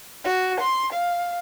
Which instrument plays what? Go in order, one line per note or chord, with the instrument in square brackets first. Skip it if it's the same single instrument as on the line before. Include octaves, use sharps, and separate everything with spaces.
[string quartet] F#4
C6
F5